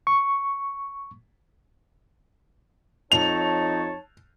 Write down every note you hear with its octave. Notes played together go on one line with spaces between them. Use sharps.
C#6
F2 D#4 C#5 A5 F7